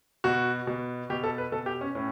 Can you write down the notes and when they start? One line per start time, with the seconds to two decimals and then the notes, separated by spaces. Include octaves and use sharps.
0.24 B2 F#4
0.67 B2
1.10 B2 G4
1.24 A4
1.38 B4
1.52 B2 A4
1.66 G4
1.81 C#4
1.95 A2 C#4